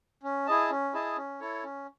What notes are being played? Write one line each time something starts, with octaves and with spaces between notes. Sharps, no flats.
C#4
E4 G#4 D#5 A5
C#4
E4 G#4 D#5 A5
C#4
E4 A4 C#5
C#4